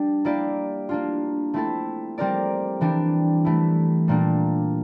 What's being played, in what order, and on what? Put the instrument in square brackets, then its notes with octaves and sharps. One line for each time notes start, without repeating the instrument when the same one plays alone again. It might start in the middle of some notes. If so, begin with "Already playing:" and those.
Already playing: [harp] G3 D4
A#3 E4 G4 D5
A#3 D4 F4
A3 C4 E4 A4
G3 C4 G4 A#4 D5
E3 G3 D4 G4
E3 A3 E4
A#2 G3 A#3 D4